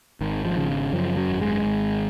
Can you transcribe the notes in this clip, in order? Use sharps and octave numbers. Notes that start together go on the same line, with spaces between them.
G#1 D#3
F3
C#3
F#2 F3
F#3
G#1
G#3
G#1